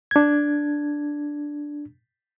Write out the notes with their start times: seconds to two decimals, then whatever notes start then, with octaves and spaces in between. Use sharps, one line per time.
0.11 D4 G#6